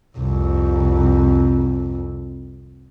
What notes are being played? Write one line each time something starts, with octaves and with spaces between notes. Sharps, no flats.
C2 F2